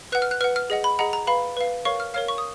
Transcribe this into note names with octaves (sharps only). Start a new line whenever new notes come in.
B4 F#5 F#6
F6
F#6
B4 F#5 F6
F6
G#4 D#5 F#5
B5
G#4 D#5 F#5 A#5
A#5
B4 F5 B5
B4 F5
A#4 C#5 F5 C#6
F6
A#4 C#5 F5 F6
C#6
D#6